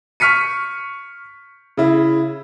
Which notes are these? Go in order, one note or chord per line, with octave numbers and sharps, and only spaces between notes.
C#6 F6 B6 C#7 D#7
C#3 E4